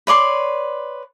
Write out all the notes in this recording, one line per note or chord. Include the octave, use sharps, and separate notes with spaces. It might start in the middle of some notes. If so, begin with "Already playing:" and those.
B4 C#5 D5 C6